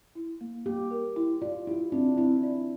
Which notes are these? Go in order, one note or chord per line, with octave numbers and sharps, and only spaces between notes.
E4
A#3
A#3 G4
A#4
E4
F4 D5
E4 G4
C4 D4
C4 E4
D5